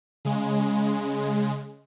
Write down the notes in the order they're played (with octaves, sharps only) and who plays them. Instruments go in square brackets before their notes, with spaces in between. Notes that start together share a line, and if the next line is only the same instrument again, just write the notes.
[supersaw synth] C#3 G#3